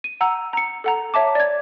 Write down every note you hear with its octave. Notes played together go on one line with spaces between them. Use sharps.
D#7
F#5 A#5 E6
A#5 C#7
A4 F#5 A#5
C#5 E5 A5 D6
D5 G#6